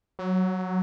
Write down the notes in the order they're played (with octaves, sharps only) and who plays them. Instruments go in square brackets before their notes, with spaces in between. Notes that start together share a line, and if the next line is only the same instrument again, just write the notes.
[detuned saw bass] F#3